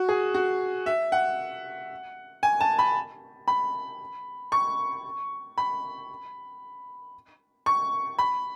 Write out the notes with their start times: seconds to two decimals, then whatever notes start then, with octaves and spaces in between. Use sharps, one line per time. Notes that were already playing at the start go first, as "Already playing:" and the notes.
Already playing: F#4
0.09 G#4
0.34 F#4
0.86 E5
1.12 F#5
2.43 G#5
2.61 A5
2.79 B5
3.48 B5
4.52 C#6
5.58 B5
7.66 C#6
8.19 B5